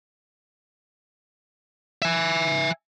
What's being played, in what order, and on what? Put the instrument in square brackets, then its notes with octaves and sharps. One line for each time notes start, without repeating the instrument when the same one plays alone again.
[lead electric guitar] E5 G#5